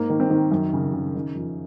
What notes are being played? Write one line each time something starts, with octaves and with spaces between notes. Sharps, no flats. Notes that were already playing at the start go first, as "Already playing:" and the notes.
Already playing: G#2 A#3
D#3
C4
D#3
F#2
C#3
C#3
D#3
F2